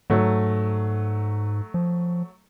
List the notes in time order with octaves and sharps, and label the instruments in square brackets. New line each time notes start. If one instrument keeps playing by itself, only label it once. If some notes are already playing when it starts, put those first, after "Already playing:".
[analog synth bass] G#2 [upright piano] F#3 A3
[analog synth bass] F3